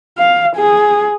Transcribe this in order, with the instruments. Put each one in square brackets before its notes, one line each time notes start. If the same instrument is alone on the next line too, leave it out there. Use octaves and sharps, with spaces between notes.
[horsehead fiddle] F5
G#4